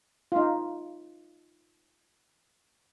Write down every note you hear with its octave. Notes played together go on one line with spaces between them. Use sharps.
D#4 F4